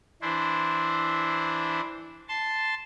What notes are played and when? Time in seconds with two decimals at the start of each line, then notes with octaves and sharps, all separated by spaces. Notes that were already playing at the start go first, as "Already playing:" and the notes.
0.22 E3 D4 E4 C5
2.28 A5 C6